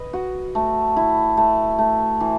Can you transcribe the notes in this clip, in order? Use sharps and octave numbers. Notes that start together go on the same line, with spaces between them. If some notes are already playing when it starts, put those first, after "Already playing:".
Already playing: B4 D#5
F#4
A3
E4
A3
A3
E3